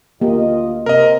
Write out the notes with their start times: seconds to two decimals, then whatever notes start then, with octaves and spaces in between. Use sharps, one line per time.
0.21 D2 A#3 F4 G4 D#5
0.86 C3 A#4 D#5